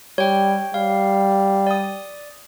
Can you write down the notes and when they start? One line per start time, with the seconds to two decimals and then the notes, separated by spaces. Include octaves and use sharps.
0.18 G3 C#5 G5
0.74 G3 F5
1.67 D5 D#6